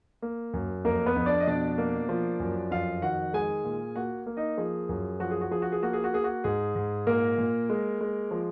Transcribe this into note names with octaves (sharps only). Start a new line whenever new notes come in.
A#3
F#2
F2 A#3 A#4
B3 B4
F2
D4 D5
D#5
B2 D4 D5
A#3
F3
F#2
F2 F4 F5
D#3 F#4 F#5
G#3 G#4 G#5
A#2
A#3 F#4 F#5
A#3
D#4 D#5
F3 G#4
F#2
F3 F#4
G#4
F#4
F3 G#4
F#4
G#4
A#3 F#4
G#4
F#4
A#3 G#4
F#4
G#2 G#4
G#2
A#2 A#3 A#4
A#2
G#3
G#3
F3